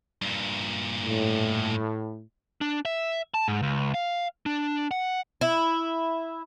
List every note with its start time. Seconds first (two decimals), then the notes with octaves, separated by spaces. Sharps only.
0.22 G2 A#2
1.03 A2
2.61 D4
2.85 E5
3.34 A5
3.48 G#2
3.63 C#2
3.94 F5
4.46 D4
4.91 F#5
5.41 E4